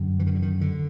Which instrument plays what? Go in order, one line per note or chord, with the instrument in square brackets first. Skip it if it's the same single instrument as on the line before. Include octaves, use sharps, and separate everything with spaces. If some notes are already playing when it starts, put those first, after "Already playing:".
Already playing: [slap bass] F#2 D3
E3
D#3
D3
D#3
D3